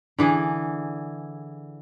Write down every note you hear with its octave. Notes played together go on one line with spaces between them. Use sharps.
D3 E3 G#4